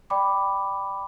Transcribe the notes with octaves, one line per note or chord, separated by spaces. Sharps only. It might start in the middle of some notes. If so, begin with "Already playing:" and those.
D5 G5 B5 D6